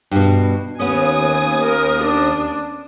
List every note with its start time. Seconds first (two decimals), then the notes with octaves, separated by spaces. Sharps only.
0.11 G2 B2
0.79 D#2 B3 C#4 G#5 D#6
1.64 A#4
2.04 D4